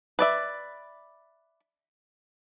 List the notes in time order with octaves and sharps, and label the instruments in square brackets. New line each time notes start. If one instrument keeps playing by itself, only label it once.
[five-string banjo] B4 D5 E5